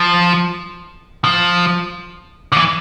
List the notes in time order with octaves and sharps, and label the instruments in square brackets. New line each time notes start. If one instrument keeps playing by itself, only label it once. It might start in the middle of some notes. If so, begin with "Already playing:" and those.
Already playing: [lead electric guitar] F3
F3
D3
E3